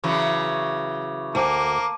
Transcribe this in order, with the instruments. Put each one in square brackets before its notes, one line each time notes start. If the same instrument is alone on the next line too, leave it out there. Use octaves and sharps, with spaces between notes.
[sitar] C#3 E3 F#3 [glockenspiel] C#6 D6
[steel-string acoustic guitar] D2 [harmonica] A#3 [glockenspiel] A5 D6 D#7